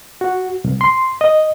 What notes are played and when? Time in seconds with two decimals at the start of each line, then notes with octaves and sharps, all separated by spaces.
0.21 F#4
0.64 C2
0.81 C6
1.21 D#5